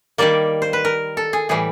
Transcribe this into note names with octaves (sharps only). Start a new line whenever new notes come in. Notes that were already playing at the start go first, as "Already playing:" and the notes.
D#3 G3 A#3 D5
C5
B4
A#4
A4
G#4
A2 E3 G3 G#4